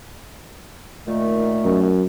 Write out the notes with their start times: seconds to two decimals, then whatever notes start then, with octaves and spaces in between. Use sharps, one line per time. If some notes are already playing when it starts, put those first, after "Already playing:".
1.06 A#2 D#3 A3
1.65 F#2